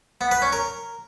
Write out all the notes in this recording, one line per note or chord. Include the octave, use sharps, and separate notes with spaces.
B3
B4
C#4
A#4